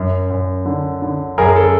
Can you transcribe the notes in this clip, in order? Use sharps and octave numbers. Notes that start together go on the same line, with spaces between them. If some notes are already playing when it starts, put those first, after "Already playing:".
Already playing: F#2
F#2
D3
D3
F#2 G#4 A#4
A4